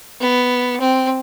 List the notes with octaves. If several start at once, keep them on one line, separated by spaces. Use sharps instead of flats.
B3
C4